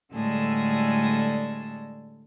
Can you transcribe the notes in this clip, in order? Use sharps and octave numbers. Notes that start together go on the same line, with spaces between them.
A2 D3 G3 G#3 G#4 A4